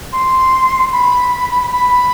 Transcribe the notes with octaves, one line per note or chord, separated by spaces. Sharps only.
C6
B5
B5